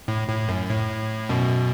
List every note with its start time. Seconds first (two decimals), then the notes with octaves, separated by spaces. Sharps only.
0.08 A2
0.29 A2
0.49 F#2
0.69 A2
1.29 F#2 B2